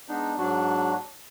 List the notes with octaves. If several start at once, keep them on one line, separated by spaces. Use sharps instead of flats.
G#3 B3 D4 D#4
G#2 F#3 D4 F#4